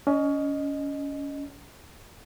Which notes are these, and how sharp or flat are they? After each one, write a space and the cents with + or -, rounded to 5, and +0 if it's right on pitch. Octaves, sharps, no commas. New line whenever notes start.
C#4 +25 D#5 -10